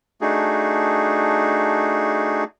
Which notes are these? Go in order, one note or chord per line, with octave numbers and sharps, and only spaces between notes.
A3 D4 D#4 F#4 G#4